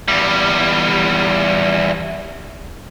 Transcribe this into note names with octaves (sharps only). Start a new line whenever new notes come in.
E2 G3